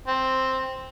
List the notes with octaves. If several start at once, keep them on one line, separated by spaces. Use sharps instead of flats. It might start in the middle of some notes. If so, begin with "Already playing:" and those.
C4